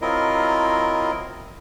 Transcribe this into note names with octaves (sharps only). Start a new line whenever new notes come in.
F#3 C4 E4 F4 A#4 D#5